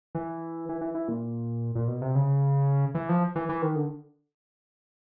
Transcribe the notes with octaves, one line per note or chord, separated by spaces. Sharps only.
E3
E3
E3
E3
A#2
A#2
B2
C3
C#3
E3
F3
E3
E3
D#3
D3